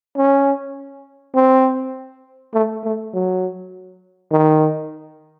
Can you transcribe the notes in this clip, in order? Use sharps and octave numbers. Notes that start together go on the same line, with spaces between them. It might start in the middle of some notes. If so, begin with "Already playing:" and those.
C#4
C4
A3
A3
F#3
D#3